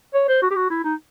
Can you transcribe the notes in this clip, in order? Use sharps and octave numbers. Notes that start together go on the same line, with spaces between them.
C#5
C5
F#4
G4
F#4
E4
D#4